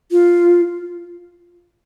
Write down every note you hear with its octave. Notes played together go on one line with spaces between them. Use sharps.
F4